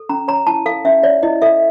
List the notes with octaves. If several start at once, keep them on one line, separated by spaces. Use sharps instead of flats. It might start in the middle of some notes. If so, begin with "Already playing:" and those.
Already playing: A4
C#4 A#5
C#5 A#5
E4 A5
A4 F5
C#4 E5
C#5 D5
E4 D#5
A4 E5